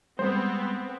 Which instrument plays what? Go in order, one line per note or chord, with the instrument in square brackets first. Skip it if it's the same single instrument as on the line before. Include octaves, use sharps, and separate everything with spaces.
[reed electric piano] G3 G#3 [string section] B3 C4 [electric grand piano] C5